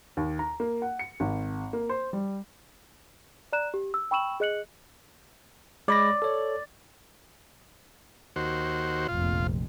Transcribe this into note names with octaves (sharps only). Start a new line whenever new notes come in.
D#2
A#5
A#3
F#5
C#7
G#1
A#3
C5
G3
D5 A#5 F#6 E7
G4
E6
G5 B5 C#6 E6 E7 F#7
G#4 D#5 F#6 C#7 F#7
G#3 D5 B5 A#6
A4 C#5
D#2 F#4 C5
F1 A#1 F2 F4